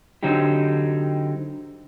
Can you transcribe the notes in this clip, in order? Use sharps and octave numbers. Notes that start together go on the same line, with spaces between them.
D3 F#3 C4 D#4 G4